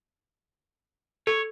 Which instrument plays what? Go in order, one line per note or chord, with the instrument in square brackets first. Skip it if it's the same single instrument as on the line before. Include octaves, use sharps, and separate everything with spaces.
[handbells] A4 [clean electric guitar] C#5